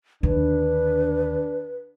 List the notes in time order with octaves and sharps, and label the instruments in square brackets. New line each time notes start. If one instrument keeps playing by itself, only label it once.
[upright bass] D#2 D3 [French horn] D4 [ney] B4